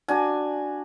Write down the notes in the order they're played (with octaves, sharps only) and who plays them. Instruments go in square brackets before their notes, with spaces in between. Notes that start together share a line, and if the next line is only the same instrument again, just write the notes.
[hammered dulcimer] D4 F#4 G#5